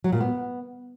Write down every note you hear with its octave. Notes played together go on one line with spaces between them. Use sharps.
F#3
A#2
B3